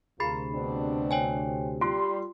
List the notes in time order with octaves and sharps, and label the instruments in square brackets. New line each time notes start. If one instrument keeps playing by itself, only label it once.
[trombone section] D2 C3 [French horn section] F4 A#4 [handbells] G#4 B5 C7
[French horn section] B2 C4 D4
[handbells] C#5 G5 G#5
[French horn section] G3 [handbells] F4 [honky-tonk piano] C6